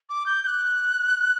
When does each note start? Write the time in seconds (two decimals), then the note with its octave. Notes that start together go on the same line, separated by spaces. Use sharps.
0.10 D6
0.26 G6
0.43 G6
0.47 F#6